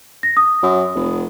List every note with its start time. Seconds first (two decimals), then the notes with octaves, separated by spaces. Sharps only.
0.23 A#6
0.37 D#6
0.63 F#2
0.95 F1